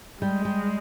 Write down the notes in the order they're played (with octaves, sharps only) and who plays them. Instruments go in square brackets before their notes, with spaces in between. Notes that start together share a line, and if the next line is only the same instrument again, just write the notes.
[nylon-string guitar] G3 [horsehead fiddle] G#3
[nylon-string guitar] G3